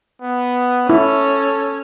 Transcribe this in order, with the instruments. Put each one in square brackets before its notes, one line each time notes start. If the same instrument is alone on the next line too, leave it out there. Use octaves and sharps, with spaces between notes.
[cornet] B3
[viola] C#4 C#5 [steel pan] E4 [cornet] A4